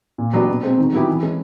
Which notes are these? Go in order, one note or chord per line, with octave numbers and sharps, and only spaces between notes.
A#2
F#3 B3 D4 G4
B2
G#3 C4
D#3
F#3 B3 E4 G4
E3
G#3 C#4